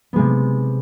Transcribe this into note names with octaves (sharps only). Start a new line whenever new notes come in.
C3 G#3 B3